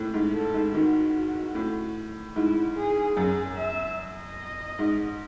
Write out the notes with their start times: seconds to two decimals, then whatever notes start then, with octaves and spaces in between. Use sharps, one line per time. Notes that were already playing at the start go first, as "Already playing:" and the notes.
Already playing: A2
0.14 G#2
0.34 A4
0.54 G#2
0.73 D#3 F#4
1.55 A2
2.36 G#2 E4
2.76 G#4
3.17 F#2 G#4
3.57 E5
3.98 D#5
4.79 G#2